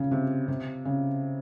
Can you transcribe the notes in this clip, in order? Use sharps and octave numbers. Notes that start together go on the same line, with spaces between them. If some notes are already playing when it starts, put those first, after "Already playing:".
Already playing: C#3
C3
C3
C#3